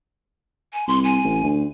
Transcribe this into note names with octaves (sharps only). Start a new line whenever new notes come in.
G#5
C2 C6
G#5
A1
D2